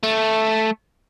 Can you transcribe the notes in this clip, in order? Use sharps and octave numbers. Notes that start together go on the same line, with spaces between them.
A3